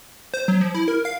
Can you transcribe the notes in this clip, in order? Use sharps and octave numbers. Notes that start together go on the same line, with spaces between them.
C5
F#3
F3
E4
A#4
F5